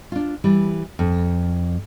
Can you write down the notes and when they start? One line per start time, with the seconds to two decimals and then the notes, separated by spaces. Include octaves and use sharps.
0.12 D4 F4
0.44 E3 G3
0.99 F2